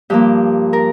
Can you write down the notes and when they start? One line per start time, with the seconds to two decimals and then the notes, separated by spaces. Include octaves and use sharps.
0.10 G2 F3 A#3 G4
0.73 A#4